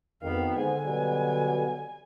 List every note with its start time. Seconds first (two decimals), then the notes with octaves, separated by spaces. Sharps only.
0.23 G#1 F2 D#3 B3 F5
0.57 G#2 D3 G#5
0.86 B2 F#3 G3